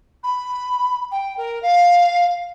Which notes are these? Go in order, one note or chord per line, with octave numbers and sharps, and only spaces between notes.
B5
G5
A#4
F5